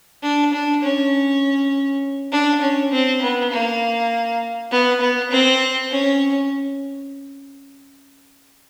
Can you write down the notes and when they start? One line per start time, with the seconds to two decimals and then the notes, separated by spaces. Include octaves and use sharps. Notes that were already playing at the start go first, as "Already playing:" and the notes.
0.22 D4
0.53 D4
0.82 C#4
2.32 D4
2.61 C#4
2.91 C4
3.21 B3
3.52 A#3
4.71 B3
5.01 B3
5.31 C4
5.90 C#4